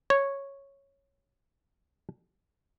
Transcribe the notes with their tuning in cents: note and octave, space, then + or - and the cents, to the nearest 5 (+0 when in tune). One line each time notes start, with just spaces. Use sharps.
C#5 -5